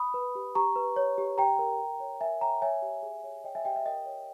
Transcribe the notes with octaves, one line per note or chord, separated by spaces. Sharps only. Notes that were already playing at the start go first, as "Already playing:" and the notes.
Already playing: B5 D#6
B4
G4
G4 A#5 C#6
B4
C#5
G4
G4 G5 A#5
A#4
A#4
C#5
A#4 E5 G#5
C#5 G5 A#5
C#5 E5 G#5
G4
G#4
C#5
C#5 D#5 G5
E5 G#5
G4 D#5 G5
E5
A#4 D#5 G5
C#5